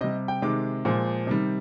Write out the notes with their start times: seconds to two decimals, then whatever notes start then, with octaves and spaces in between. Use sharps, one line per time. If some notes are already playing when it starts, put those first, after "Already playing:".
0.01 C3 G3 D#5
0.28 G5
0.42 C3 D#3 G#3 D6
0.85 A#2 F3 G#3
1.27 C3 D#3 G3